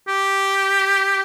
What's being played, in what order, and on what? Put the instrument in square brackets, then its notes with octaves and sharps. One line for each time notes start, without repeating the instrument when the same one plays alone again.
[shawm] G4